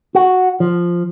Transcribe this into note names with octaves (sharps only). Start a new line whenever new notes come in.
F#4
F3